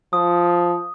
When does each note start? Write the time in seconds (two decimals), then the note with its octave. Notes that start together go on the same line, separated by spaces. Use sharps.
0.13 F3 D#6